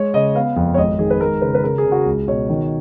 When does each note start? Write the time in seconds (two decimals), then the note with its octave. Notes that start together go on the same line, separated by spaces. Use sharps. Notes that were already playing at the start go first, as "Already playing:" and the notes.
Already playing: G#3 C#5
0.14 C#3 D#5
0.35 B3 F5
0.56 F2
0.74 C#5
0.77 G#1 D#5
0.99 D#3 G#4
1.10 B4
1.20 G#3 A#4
1.42 C#3 B4
1.54 B4
1.64 C#3 A#4
1.78 G#4
1.85 C#3
1.92 F#4
2.06 C#2
2.28 B2 C#5
2.49 D#3